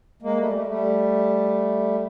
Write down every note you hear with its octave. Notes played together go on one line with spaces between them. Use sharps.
G#3 A#3
G3 A3
G3 A3
G3 A3